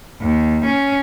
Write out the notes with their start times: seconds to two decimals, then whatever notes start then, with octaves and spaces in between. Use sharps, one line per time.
0.22 D#2
0.65 C#4